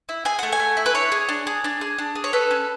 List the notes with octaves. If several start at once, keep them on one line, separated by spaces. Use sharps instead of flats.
E4
G#4 G#5
A3 F#5
G#5
A3
E4
B4
D4 C#5
G#4
D4
G#4
D4
G#4
D4
G#4
C#5
A4 B4
C#4